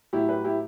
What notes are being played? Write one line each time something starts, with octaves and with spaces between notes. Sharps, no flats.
A2 F#3 E4 G4
G4 B4
E4 G4